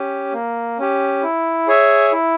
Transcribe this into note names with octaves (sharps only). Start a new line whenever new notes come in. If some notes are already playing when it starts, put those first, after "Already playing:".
Already playing: C#4 G4
A#3
C#4 G4
E4
G#4 C#5 E5
E4